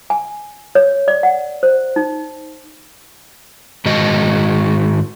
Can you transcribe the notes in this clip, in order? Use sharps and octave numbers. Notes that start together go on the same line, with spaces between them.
G#5
C#5
D5
F#5
C5
D#4
G#2 D#3 G#3 F#4 D#5